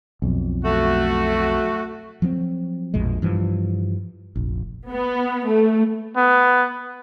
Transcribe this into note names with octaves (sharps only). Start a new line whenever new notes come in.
B1 F2
A3 F#4
F3 F#3 B3 C4
A#1 F2 B2 G#3
G2 E3 F3
F1 A#1
B3
A3
B3